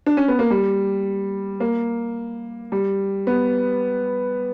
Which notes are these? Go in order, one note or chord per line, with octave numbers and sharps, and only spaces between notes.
D4
C#4
B3
A#3
G3
A#3
G3
B3